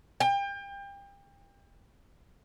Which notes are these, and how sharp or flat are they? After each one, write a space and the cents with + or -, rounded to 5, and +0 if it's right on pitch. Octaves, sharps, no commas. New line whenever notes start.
G5 +30